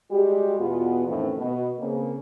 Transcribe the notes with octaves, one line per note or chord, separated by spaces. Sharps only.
G3 G#3 F#4 G4
E2 B2 B3 F4
F2 A2 D#3 E3 C4 C#4
B2
C#3 A#3 C4